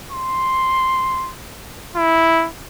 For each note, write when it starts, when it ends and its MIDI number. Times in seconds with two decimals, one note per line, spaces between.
0.12 1.32 84
1.96 2.48 64